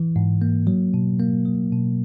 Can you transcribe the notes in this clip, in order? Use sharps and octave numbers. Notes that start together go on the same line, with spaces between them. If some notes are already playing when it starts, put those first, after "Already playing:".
Already playing: E3
G#2
A#3
F#3
B2
A#3
F#3
B2